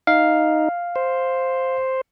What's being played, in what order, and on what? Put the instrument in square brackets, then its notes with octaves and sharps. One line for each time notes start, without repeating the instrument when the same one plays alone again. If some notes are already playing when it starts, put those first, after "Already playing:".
[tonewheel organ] D#4 [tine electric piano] F5
[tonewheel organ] C5